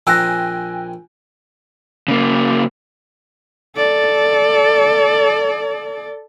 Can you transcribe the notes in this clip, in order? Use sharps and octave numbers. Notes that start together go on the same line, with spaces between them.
A#1 A#4 C5 G5 G#5 E6 F#6 A#6
C#3 A#3
A4 D5